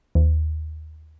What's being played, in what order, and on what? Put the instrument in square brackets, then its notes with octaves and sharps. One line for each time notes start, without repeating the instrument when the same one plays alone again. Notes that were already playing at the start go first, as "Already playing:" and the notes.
[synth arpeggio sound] D#2